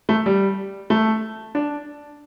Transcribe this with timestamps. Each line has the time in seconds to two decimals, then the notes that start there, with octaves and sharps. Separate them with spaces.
0.09 A3
0.26 G3
0.90 A3
1.55 D4